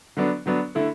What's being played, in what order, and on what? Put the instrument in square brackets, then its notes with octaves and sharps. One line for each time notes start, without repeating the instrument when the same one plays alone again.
[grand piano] D3 F#3 B3 D4
D3 F#3 B3 D4
D3 A3 E4